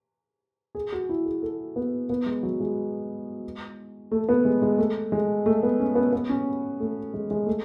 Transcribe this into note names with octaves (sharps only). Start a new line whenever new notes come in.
G#4
F#4
E4
G#4
A4
B3
B3
G#3
F#3
G#3
A3
B3
G#3
G#3
A3
G#3
A3
B3
C#4
B3
B3
C#4
A3
G#3
G#3
A3